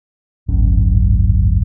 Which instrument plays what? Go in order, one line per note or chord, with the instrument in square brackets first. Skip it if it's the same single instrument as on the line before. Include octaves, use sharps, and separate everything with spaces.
[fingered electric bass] D1 G#1 F#2 C#4